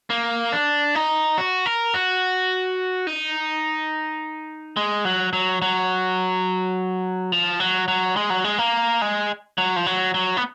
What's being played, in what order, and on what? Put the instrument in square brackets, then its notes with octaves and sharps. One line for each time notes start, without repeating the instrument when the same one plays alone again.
[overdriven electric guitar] A#3
D4
D#4
F#4
A#4
F#4
D#4
G#3
F#3
F#3
F#3
F3
F#3
F#3
G#3
F#3
G#3
A#3
G#3
F#3
F3
F#3
F#3
B3